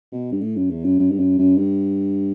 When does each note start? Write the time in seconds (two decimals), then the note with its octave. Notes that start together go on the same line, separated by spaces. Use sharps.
0.12 B2
0.32 G2
0.41 A2
0.56 F#2
0.70 E2
0.85 F#2
0.99 F#2
1.11 G2
1.19 F#2
1.38 F#2
1.57 G2